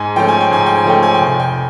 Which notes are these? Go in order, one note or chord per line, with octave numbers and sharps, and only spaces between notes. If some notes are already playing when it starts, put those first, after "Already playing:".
Already playing: G#2 G#5
F3 A3 C#4 G5
G#5
G5
G#2 G#5
G5
G#5
F3 A3 C#4 G5
G#5
G5
F1
G#5
G5